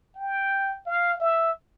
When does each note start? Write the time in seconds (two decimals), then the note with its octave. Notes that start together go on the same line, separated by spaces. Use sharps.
0.16 G5
0.86 F5
1.20 E5